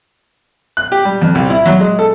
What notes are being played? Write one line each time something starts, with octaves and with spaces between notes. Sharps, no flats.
F#6
G4
G3
F2
C2
E4
F#3
G#3
A4